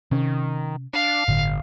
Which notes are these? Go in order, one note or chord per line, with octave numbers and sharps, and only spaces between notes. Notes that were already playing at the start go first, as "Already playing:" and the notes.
C3 D#3 C#4
D4 F5
G1 A2 D3